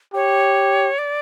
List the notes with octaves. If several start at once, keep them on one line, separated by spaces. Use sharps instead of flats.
G4 C#5
D5